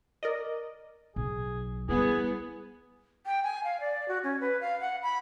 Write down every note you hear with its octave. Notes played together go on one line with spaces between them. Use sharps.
A#4 D5 D#5
B1 G#4
G3 B3 E4 G#4
G5
G#5
F5
D5
F#4
C#4
B4
F5
F#5
B5